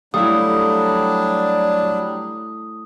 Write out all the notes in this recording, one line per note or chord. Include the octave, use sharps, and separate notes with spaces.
F#3 G3 A3 D4 E4 G4 F5 D#6